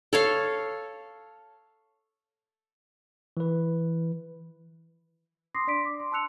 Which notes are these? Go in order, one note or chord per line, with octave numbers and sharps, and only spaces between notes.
A4 C#5 F5
E3 B4
C6 D6 D#6 A#6 C7
D4 D5 C6 B6 D7
D6
C6
A5 C6 E6 F#6 C#7 F7